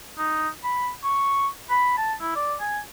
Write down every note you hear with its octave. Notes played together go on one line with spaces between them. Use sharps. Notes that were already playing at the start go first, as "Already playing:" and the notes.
D#4
B5
C#6
B5
A5
E4
D5
G#5